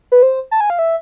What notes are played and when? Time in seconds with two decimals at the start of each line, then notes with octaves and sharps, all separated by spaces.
0.12 B4
0.22 C5
0.51 A5
0.61 G#5
0.70 F5
0.79 E5